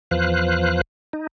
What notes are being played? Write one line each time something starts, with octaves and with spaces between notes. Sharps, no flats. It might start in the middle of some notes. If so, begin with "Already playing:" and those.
E2 F3 B4 C5 F5 F#6
D#4